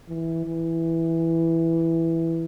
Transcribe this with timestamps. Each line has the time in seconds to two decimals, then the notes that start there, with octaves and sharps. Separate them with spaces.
0.08 E3
0.45 E3